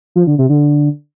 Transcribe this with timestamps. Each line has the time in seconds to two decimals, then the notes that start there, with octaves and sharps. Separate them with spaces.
0.16 F3
0.27 D3
0.38 C3
0.49 D3